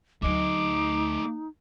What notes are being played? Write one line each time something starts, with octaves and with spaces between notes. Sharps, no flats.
D2 F#3 A3 D#4 D#5 D6